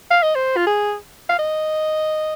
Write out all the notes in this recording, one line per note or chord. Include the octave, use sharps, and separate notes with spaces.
F5
D#5
C5
F4
G#4
F5
D#5